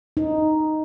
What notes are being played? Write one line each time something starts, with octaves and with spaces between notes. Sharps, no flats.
D#4